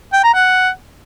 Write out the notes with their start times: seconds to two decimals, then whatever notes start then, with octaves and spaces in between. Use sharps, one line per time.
0.13 G5
0.23 A#5
0.34 F#5